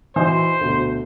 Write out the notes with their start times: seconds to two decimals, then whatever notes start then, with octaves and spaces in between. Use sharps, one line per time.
0.16 E3 D#4 F#4 C5
0.61 D2 B2